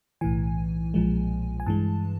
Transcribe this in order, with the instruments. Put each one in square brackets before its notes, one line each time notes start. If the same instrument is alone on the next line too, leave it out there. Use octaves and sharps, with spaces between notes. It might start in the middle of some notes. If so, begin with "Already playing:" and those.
[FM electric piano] B1 A2 E3 G#5
B1 A#2 F3 G#3
G#5
G2 E3 G#3 A5